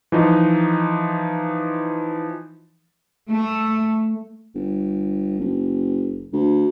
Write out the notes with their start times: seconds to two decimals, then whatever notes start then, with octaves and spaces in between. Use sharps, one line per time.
0.12 E3 F3 D#4
3.28 A3
4.55 G1
5.40 F#1
6.33 D2